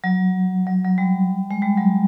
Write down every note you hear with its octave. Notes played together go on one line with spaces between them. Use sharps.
F#3
F#3
F#3
G3
G#3
G3
F#3